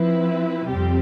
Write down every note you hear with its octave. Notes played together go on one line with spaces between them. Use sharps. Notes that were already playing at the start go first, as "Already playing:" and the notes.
Already playing: F3 C4 E4 B4
F2 C3 G3 C4 G4